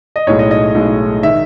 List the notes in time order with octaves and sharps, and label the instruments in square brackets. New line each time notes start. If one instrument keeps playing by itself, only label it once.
[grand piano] D#5
B1 A2 G#3 D#4 C#5
D#5
D#5
B1 A2 G#3 D#4
D#3 E5